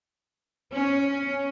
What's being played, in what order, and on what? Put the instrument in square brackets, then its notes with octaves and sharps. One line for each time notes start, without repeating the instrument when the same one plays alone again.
[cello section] C#4